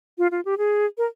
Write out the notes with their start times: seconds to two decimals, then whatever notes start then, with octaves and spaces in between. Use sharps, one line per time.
0.18 F4
0.31 F4
0.45 G4
0.58 G#4
0.98 A#4